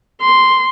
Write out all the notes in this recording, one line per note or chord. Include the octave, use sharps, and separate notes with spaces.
C6